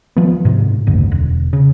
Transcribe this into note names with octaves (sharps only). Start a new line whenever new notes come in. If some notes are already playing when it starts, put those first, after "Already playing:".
F3 B3
G#2 C3
F#1 D2
E1
C#3